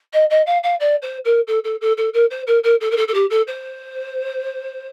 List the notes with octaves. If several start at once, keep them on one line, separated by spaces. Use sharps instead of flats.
D#5
D#5
F5
F5
D5
C5
A#4
A4
A4
A4
A4
A#4
C5
A#4
A#4
A4
A#4
A4
A4
G4
A4
C5